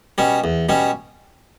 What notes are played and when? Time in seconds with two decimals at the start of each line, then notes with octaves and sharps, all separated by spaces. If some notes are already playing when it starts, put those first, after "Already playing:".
0.18 B2 G3 C#4
0.44 E2
0.69 B2 G3 C#4